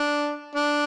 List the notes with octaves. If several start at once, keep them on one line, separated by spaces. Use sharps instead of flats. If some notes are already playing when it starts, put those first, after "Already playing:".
Already playing: D4
D4